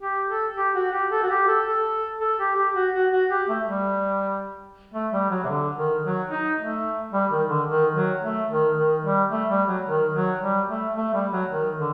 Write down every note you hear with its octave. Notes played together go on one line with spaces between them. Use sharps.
G4
A4
G4
F#4
G4
A4
F#4
G4
A4
A4
A4
G4
G4
F#4
F#4
F#4
G4
A3
G3
A3
G3
F#3
C3
D3
D#3
F#3
D#4
A3
G3
D#3
D3
D#3
F#3
A3
D#3
D#3
G3
A3
G3
F#3
D#3
F#3
G3
A3
A3
G3
F#3
D#3
D3